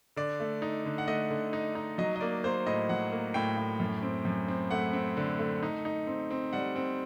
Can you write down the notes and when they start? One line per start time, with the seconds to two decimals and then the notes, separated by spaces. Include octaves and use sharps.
0.16 D3 D5
0.40 A3
0.62 D#4
0.85 D3
0.98 F#5
1.08 A3 D#5
1.31 D3
1.53 D#4
1.75 D#4
1.98 F#3 D#5
2.16 D#5
2.21 A#3 D5
2.44 A#3 C5
2.66 A2 D#5
2.89 F#3 F#5
3.12 A#3
3.34 A2 G5
3.57 A2
3.80 F#2
4.02 C4
4.25 F#2
4.48 C4
4.71 A3 F#5
4.93 C4
5.17 D3
5.39 A3
5.63 D#4
5.85 D#4
6.07 C4
6.31 C4
6.53 G3 F#5
6.76 C4